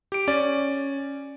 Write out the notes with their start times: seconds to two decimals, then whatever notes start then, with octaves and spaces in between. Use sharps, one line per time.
0.12 G4 D7
0.28 C#4 D5